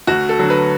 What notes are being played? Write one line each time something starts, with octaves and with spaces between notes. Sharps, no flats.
D2 F#4
A4
D3 F#3
B4